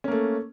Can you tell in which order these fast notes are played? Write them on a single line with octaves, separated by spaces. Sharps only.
C#4 A#3 A3